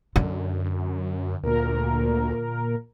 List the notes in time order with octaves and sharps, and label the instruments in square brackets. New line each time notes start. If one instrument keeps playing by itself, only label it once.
[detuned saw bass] F#2 [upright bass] D3
[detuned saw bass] D2 [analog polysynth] A#2 A#4